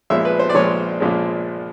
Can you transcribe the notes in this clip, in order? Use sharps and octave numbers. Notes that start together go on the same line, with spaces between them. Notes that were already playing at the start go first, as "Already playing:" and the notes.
A#1 A#2 F3 G#3 C#4 E5
B4
C5
D5
A#1 A#2 F3 G#3 C#4 C#5
A#1 A#2 F3 G#3 C#4